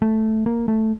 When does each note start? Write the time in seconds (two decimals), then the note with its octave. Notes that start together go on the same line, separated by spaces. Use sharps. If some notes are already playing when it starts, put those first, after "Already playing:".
0.02 A3
0.46 A#3
0.68 A3